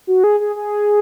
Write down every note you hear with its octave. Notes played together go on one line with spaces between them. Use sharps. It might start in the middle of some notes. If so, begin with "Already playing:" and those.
F#4
G#4
G#4
G#4